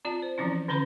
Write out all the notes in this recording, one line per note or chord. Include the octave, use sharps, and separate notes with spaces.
C4 F4 D5 A5
C5
E3 F3 C4 C#4 E4
D3 C#4 B4 B5 C6